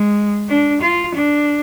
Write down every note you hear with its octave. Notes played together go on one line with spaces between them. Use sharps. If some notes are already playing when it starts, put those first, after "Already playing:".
Already playing: G#3
D4
F4
D4